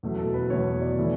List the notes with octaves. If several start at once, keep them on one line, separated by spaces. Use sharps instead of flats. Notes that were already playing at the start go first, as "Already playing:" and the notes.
E2 B2 F#3 A3
A4
B4
E2 B2 F#3 A3 C#5
D5
E3 A3